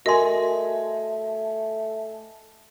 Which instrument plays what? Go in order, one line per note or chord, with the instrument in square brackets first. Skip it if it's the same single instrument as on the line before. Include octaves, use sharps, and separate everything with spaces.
[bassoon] A3 [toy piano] F#4 C6 [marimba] A#4 [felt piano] D#5 G#5